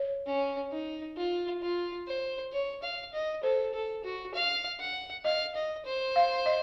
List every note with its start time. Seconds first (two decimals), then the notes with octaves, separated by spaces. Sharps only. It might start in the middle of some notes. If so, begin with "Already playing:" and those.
Already playing: C#5
0.26 C#4
0.71 D#4
1.17 F4
1.62 F4
2.07 C5
2.52 C#5
2.83 F5
3.14 D#5
3.43 A4 C5
3.73 A4
4.04 F#4
4.34 F5
4.80 F#5
5.25 D#5 F5
5.55 D#5
5.86 C5
6.16 F5
6.46 D#5